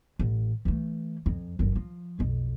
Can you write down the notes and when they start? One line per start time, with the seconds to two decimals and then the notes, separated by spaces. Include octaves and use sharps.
0.19 A1
0.65 E3 A3
1.26 F2
1.59 G1 F#2
1.75 F3
2.19 B1 F2